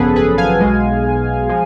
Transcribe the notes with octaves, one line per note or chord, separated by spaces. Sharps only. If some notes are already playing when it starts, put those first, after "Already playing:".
Already playing: G#1 F#2 C#3 F3 B3 G#4 A4 B4
G#4 B4
F5 G#5
B1 B2 G#3
F3 G#3